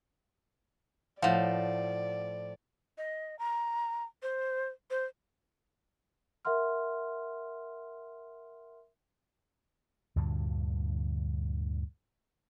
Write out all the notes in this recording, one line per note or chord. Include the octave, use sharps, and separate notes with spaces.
A2 F3 D5 F5 F#5
D#5
A#5
C5
C5
A#4 E5 F#5 C6 F6
D2 G2 A#2 D3